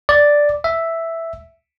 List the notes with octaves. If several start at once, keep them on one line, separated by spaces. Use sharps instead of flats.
D5
E5